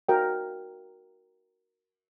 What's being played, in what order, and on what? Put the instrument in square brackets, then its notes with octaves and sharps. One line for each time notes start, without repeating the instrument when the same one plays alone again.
[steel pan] F#4 A#4 D5 F5 G5